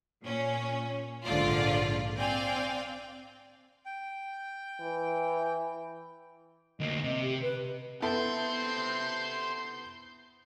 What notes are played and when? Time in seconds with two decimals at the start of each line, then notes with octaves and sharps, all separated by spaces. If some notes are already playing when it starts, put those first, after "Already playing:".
0.22 A#2 C#4
1.25 A#1 G#2 D3 F4 D5
2.17 C4 D5 F5 G5 G#5
3.86 G5
4.81 E3
6.80 D2 A#3 D#5
7.03 C3
7.22 G4
7.42 B4
8.02 B3 E4 G4 A4 C5 C6 G6